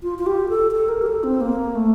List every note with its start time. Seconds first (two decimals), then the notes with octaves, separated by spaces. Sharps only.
0.03 F4
0.19 F4
0.26 G4
0.49 A4
0.72 A4
0.89 A#4
1.02 G4
1.06 A4
1.24 C4
1.41 A#3
1.75 A3